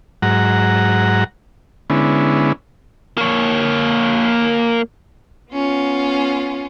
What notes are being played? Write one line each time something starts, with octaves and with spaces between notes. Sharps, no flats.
G#2 F#3 F#5 A#5
D3 G#3 B3 C#4 E4
A#3 C#5
B3 C#4 F4